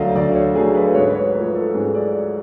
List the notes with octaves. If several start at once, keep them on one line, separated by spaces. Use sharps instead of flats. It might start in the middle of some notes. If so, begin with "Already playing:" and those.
Already playing: D2 D3 F#3 A3 F5
D2 D5
C#5
D3 F#3 A3 G#4
B4
G#2 C#5
B4
C#5
F3 A3 B4
A4
G#2 G#4
D5